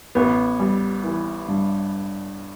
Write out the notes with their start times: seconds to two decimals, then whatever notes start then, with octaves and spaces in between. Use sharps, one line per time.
0.15 A1 B3
0.59 G3
1.04 E3
1.48 G2